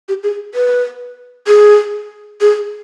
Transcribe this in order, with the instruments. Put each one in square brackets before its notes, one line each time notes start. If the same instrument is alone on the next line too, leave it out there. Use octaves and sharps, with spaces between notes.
[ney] G4
G#4
B4
G#4
G#4